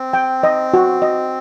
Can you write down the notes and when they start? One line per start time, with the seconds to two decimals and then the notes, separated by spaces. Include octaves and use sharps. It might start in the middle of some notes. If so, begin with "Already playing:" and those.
Already playing: C4
0.13 G5
0.43 D#5
0.74 F#4
1.02 D#5